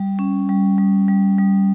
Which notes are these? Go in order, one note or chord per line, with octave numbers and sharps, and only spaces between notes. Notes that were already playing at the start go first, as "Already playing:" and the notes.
Already playing: G3
C#4
G3
G3
G3
G3